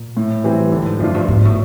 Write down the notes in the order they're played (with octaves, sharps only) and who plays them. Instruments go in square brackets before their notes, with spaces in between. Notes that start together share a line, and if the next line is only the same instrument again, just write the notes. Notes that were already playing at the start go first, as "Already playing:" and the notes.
Already playing: [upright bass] A#2
[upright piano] A2
E3 G3 C4
[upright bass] A2 [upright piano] D3
[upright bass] A2
G#2
[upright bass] F#2 [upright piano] F3 A3 D4 F4
[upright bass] G2
[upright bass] G#2 [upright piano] B2
[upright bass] A2